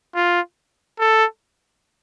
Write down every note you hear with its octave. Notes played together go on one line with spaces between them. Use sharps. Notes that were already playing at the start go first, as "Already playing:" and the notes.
F4
A4